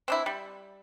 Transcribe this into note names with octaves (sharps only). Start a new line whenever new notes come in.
C4 D4 E4
G3